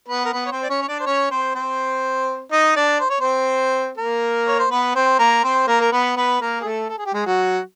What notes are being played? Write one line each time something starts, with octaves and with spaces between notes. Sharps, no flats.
B3 B4
A#4
B3 B4
C#5
C4 C5
D5
C#4 C#5
C#5
D4 D5
C5
C#4 C#5
C4 C5
C4 C5
D#4 D#5
D4 D5
C5
C#5
C4 C5
A#3 A#4
C#5
C5
B3 B4
C4 C5
A#3 A#4
C4 C5
A#3 A#4
A#4
B3 B4
B3 B4
A#3 A#4
G#4
A3 A4
A4
G#4
G4
G#3 G#4
F#3 F#4